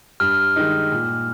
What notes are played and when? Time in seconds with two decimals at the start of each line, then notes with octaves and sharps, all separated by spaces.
0.20 G2 F6
0.56 D#3 G#3 D#4
0.91 A#2